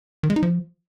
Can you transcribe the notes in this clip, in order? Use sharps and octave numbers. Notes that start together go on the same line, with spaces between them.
D#3
G#3
D#4
F3